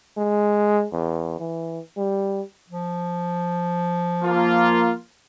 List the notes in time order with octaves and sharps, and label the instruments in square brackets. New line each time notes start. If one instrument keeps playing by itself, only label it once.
[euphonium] G#3
E2
E3
G3
[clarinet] F3
[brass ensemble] A#3 F4